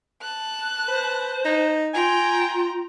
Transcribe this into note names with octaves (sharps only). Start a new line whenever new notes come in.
A5 F#6
B4 C5
D#4
F4 G5 G#5 A#5